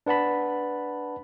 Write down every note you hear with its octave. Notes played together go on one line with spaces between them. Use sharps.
D4 B4 F#5 A5 B5